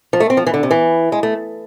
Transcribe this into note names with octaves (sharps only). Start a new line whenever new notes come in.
F3
A3
C4
F3
E3
D3
C3
E3
G#3
A3